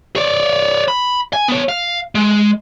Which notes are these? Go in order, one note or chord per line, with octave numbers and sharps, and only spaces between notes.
C#5 D5
B5
G#5
B3 C#5
F5
G#3